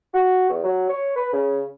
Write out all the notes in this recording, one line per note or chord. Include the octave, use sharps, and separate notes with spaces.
F#4
E2
F#3
C#5
B4
C#3